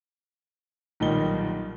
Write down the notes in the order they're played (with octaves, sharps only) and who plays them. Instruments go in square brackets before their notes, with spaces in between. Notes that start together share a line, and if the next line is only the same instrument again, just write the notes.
[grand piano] B1 A#2 D#3 G3 D#4 G7